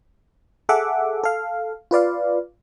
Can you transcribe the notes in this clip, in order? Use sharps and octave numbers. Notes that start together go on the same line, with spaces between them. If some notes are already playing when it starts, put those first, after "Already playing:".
G#4 A4 E5 F#5 D6
A4 F5
F4 B4 D5 F5